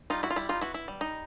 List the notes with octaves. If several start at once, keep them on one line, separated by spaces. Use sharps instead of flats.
G3 D#4 F4
E4 F#4
F4
G3 E4
D#4 F4
B3 E4 F#4
E4
G3
D#4